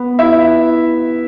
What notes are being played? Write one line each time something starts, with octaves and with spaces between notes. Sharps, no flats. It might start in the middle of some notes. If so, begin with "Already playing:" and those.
Already playing: B3 B4
E4 E5